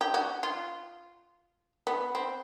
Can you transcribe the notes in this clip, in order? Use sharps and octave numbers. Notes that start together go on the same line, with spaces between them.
G4
F#4
F4
B3
C4